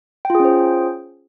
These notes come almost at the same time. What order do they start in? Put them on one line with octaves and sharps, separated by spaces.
G5 F4 G#4 C#4 C5